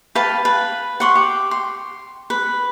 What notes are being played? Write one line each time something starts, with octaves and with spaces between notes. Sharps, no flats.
B4 F5 G5 A5
B4
F#5 C6 C#6
G4
C6
B4